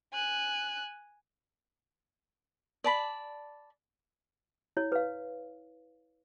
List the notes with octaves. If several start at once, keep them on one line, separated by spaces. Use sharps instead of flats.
G#5 F#6
D5 A5 B5
E4 C#5
B4 F5